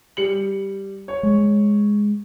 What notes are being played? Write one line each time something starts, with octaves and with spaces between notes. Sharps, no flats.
G3 C#7 F#7
C#5
G#3